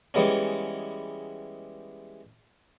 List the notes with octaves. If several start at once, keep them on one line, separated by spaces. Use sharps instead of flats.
E3 G3 G#3 B3 C#4